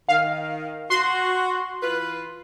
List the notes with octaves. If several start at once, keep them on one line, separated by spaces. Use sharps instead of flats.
D#3 F5
F#4 C6
E3 F4 B4